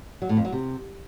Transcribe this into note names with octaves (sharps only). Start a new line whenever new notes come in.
F#3
A2
F2
F#3
C3